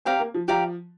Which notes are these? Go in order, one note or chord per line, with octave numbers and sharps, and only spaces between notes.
C4 G4 D5 F5 A#5
A#3
F3
F3 G4 D5 F5 A#5